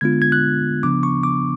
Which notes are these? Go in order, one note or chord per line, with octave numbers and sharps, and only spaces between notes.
D3 G#3 B3 D4 F4 G#6
G#6
F#6
C#3 F3 B3 D4 D6
C#6
D6